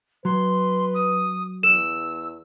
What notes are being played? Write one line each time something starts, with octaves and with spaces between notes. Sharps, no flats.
F#3 B4 C6
D#6
E2 E6 E7